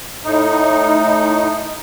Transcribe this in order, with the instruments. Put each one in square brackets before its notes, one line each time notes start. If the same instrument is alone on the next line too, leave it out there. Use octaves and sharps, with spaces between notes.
[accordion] A2 D#4